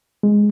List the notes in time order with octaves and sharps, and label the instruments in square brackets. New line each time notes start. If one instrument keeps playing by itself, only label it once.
[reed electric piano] G#3